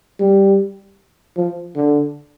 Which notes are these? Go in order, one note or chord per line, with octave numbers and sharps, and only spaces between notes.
G3
F3
D3